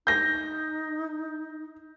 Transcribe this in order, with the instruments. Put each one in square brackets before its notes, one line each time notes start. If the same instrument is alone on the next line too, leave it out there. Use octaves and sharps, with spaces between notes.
[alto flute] D#4 [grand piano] G6 A#6